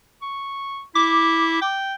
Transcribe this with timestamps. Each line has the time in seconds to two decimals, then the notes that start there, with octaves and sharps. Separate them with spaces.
0.22 C#6
0.95 E4 D6
1.62 G5